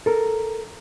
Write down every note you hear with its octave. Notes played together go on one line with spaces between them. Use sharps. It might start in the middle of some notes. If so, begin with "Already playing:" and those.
A4 A#4